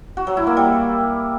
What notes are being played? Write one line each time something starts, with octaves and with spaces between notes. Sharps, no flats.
F#4
F#3
E4
A#3
G3